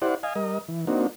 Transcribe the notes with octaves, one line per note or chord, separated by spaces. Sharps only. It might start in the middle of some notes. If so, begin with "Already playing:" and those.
E4 G4 C5 D5 F#5
D#5 F5 G#5
G3 A#4 D#5
E3
A#3 C4 D4 D#4 F#4